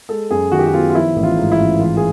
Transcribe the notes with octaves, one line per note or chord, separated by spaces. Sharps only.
G#3 A4
F#2 G#4
D#3 F#4
G4
F#4
B3 F4
F4
F3 E4
A1
F4
G#2
E4
A1
E3 F4
G#4